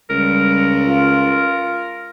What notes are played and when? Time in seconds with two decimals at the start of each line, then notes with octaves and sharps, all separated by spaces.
0.10 C#2 G3 A#4
0.84 F4